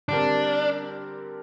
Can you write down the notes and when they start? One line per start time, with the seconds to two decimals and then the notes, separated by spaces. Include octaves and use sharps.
0.09 D3 G3 C4 D4 G4 A#4